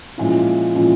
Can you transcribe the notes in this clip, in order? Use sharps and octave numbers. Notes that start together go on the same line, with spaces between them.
A#2 F3 G#3 C#4 E4
A#2 F3 G#3 C#4 E4